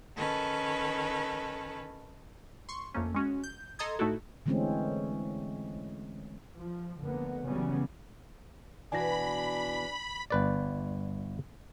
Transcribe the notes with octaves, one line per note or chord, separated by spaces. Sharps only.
D#3 C#4 A4 B4
C6 C#6
F2 A3 A#3 C#4
G#3 C#4 F#4
G6
A4 D#5 A#5 C6 D#6 G#6
A2 A3 D#4 E4 F#4 A4
D3 E3 G#3 A3 C4 C#4
F3
F1 D3 A#3 B3
C#3 E3 F#3 G3 B3 C#4
B2 E3 D4 F#4 G#5 B5 A#6
G1 B4 D5